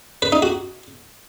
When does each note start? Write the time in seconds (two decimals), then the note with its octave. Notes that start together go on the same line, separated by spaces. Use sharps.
0.22 B4
0.32 D#4
0.42 F#4